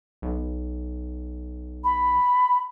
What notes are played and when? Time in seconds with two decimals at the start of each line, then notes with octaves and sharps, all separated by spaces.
0.22 B1
1.84 B5